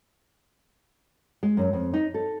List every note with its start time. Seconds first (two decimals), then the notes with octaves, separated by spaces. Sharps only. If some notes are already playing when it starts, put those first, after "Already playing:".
1.43 G#3
1.57 F#2
1.73 F2
1.94 D#4
2.14 A4